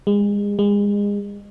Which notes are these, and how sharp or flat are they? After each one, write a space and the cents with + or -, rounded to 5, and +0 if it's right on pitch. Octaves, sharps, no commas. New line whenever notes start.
G#3 -30
G#3 -30